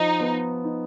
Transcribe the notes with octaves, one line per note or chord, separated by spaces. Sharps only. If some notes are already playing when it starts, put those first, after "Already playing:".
Already playing: F3 D#4
B3
D#4